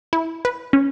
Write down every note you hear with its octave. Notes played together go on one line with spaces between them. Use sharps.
E4
B4
C#4